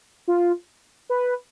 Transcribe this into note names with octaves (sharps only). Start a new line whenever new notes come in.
F4
B4